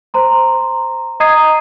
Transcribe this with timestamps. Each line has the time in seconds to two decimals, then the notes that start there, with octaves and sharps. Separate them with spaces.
0.14 C5 A#5 C6
1.20 D#5 A#5 D#6 G#6 C7 D#7